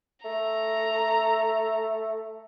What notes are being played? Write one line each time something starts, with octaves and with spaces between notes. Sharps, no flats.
A3 A#5